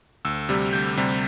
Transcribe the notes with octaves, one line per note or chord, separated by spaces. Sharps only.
D2 E6
C3 G3
D2 G6
C3 G3